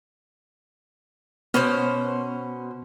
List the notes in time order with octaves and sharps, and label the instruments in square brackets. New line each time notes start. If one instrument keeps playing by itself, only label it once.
[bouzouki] B2 C#4 C5 [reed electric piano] B3 F6